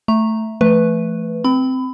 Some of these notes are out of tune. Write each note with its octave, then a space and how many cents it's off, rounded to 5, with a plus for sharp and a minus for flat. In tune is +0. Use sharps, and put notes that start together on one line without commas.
A3 +0 A#5 +0
F3 -40 A3 +0 B4 +0
C4 -10 B5 +25